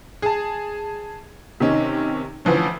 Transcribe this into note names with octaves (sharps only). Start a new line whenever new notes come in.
G#4 A5
C3 D#3 C#4 D#4
D2 E3 F3 C#4